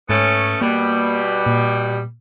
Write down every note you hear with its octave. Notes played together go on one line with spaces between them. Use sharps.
G#2 A3 B3 C#4
B2 G3 A#3
A#2